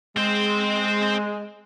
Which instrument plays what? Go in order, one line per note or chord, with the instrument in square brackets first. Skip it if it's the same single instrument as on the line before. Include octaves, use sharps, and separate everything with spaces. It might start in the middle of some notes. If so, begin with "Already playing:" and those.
[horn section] G#3 [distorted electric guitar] C4 C5